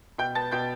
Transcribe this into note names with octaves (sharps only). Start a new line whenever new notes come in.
B2 G5 G6
B3 A5 A6
B2 G5 G6